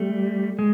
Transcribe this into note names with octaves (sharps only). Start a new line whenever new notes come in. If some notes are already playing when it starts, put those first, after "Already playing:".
Already playing: G3 A3
G#3